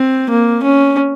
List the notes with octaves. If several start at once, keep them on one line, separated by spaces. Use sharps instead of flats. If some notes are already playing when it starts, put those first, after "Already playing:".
Already playing: C4
A#3
C#4